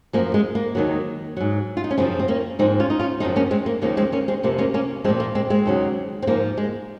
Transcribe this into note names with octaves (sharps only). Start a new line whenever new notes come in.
F#2 F3 A#3
G#3
A#3
D#2 D#3 F#3
G#2 F#3
F4
D#4
C#4
F#2 C#3 F3 G#3 C4
C4
A#3 C#4
G#2 F3 C4 D#4
C#4 F4
D#4
C#4 F4
F#2 C#3 F3 C4 D#4
A#3 C#4
G#3 C4
A#3
D#2 C#3 F3 A#3
G#3 C4
A#3 C#4
G#3 C4
F2 C3 F3 A#3
A#3 C#4
A#3 C#4
A#2 F3 G#3 C4
A#3
G#3 C4
G#3 C4
D#2 C#3 F#3
C4
G#2 F3 A#3
G#3